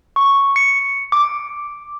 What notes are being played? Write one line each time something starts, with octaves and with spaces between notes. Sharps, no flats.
C#6
C#7
D6